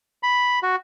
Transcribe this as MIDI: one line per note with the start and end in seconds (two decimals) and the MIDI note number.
0.23 0.59 83
0.63 0.76 66